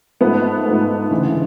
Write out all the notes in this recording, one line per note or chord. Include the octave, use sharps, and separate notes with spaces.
G#2 F3 A3 B3 B4
G#2 F3 A3
D2 C#3 E3